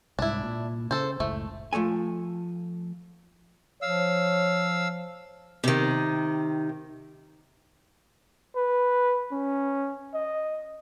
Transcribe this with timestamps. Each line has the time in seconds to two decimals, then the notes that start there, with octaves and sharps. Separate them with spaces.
0.19 C2 G#2 D4 E4
0.43 A#2
0.91 C#3 A4 C5
1.20 F#1 C#2 A2 A3
1.73 F3 A3 A4 G#5
3.82 F3 C#5 F5 E6
5.64 C3 D#3
8.56 B4
9.31 C#4
10.14 D#5